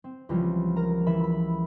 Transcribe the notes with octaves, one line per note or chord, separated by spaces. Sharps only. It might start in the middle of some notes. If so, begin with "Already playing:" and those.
C4
C#2 E3 F3 G3 F4
A#4 A#5
E3 E5 B5 E7
B5